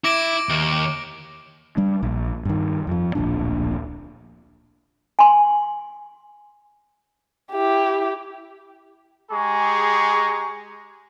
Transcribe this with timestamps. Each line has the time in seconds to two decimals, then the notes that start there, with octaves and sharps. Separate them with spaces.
0.04 E4 D6 A#6 D7
0.49 D#2
1.77 G3 D4
2.03 A#1
2.45 G2 D#3
2.87 F2 F3
3.15 D1 A#1 A#2 D4
5.19 G#5 C6
7.52 E4 G4
9.30 G#3 G4 G#4 A#5 C#6